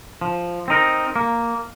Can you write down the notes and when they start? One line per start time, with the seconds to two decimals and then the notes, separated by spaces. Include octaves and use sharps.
0.21 F3
0.68 C4 D#4 A#4
1.16 A#3